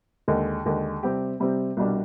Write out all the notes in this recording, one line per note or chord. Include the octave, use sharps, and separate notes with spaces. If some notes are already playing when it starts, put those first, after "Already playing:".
D#2 D3 G#3
D#2 D3 G#3
C3 G3 C4 G4
C3 G3 C4 G4
C2 B2 G3 D4